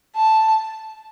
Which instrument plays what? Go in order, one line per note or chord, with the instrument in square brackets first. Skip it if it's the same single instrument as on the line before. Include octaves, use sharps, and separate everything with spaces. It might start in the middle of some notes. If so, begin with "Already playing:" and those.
[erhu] A5